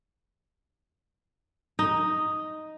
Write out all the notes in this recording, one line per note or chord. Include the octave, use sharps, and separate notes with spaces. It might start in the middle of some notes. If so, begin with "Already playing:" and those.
D#4